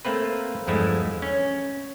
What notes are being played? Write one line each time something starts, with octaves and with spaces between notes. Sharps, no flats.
A3 A#3 C4 B4
E2 G2 F3 G#3 A3 E4
C#4